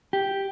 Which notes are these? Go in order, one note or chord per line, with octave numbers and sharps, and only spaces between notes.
G4